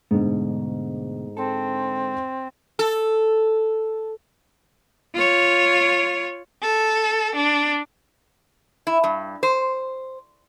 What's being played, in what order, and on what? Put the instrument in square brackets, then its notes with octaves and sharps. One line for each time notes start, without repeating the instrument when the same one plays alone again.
[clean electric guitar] D2 B2 [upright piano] G#2 D3
[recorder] C4 [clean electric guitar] A4
[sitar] A4
[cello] F4 C#5
[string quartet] A4
D4
[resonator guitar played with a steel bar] E4
G2
C5